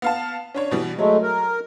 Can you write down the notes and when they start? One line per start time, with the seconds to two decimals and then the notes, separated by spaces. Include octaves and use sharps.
0.02 B3 F5 A5
0.54 C#4 D4 C#5
0.71 B2 E3 G3
0.99 F#3 G#3 A3
1.22 A#4